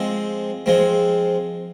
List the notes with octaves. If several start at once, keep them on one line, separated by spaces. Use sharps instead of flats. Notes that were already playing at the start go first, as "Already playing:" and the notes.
Already playing: F3 G#3 C4
F3 G#3 C4